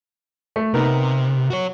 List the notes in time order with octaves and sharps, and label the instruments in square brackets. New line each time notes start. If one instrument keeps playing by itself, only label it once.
[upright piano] A3
[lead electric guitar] C3 [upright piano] B3 D#4 A#4
[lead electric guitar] F#4 C#5